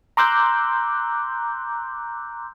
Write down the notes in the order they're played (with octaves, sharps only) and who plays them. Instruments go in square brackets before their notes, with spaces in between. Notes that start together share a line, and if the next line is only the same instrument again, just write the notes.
[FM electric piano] A#5 C6 D6 E6 F#6 G6